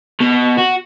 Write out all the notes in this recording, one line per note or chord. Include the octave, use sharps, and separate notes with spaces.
B2
F#4